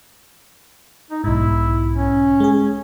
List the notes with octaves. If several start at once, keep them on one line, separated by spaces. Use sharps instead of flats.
D#4
B1 G#2 E4
C#4
G#3 G#4